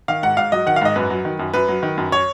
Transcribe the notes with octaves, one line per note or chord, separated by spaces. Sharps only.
D#3 F5
G#2 F#5
G#2 F5
F#3 D#5
D#3 F#5
F5
G#2 D#5
F#2 B4
F#3
D#3
F#2
F#2 B4
F#3
D#3
F#2
C#5